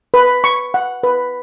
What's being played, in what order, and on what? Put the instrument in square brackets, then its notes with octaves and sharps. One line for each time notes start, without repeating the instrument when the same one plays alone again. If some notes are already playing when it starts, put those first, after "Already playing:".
[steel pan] B4
C#6
F#5
B4